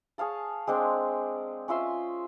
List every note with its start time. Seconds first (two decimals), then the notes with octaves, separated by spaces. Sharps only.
0.18 G#4 C#5 F5 A5
0.67 G#3 C4 D4 G#4
1.68 C#4 F4 E5 C6